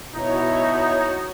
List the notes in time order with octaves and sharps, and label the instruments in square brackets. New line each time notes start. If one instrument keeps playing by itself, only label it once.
[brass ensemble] B2 E4 [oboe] D#4 [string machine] F#4 C#5